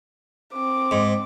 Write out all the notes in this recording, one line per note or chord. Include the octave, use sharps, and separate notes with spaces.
C4 D6
G#2